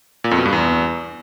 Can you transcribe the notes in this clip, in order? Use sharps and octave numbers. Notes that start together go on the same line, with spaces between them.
A#2
F2
B2
G2
E2